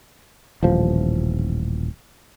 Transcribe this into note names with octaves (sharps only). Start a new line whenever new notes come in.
D#1 A1 F3